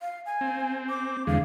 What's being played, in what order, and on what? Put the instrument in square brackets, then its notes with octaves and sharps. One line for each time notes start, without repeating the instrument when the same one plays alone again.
[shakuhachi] F5
G#5
[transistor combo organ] C4
[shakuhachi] D6
[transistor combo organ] E2 D3 G#3 [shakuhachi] F5